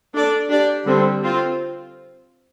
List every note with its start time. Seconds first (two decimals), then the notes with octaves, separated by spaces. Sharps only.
0.13 D4 A4 D5
0.49 D4 G4 D5
0.86 D3 G3 C4
1.23 C4 F4